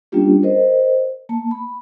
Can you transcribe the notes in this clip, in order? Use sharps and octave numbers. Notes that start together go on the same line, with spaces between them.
G3 A#3 C#4 D4 F4 G4
A#4 C5 D#5
A#3 A5
B5